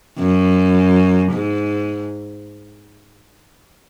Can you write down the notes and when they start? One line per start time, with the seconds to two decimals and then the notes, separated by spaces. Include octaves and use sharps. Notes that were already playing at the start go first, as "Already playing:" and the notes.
0.19 F#2
1.32 G#2